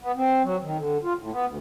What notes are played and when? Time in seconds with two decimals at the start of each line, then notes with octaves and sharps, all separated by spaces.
0.02 B3
0.16 C4
0.44 F#3
0.62 D#3
0.77 D3
1.04 F4
1.19 A2
1.32 B3
1.46 D2